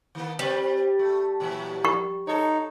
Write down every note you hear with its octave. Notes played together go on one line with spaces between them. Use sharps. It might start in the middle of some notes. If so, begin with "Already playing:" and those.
D#3 A#3 B3
G3 C4 B4
A3
A#2 E3 F#3
C#6
D#4 A4 C#5